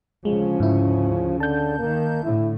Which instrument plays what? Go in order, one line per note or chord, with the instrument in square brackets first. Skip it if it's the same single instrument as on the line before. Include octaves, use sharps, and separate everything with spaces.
[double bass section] D2 C#3 C#4 [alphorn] F3 [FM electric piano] G#3
[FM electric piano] G#2 E4
[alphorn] D3 [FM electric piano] A5 G6
[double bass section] D#3 [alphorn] A#3
[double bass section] A2 D3 A3 [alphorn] E4